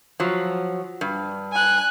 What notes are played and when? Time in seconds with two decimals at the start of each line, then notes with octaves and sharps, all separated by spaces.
0.20 F3 F#3
1.01 G2
1.52 G#5 F#6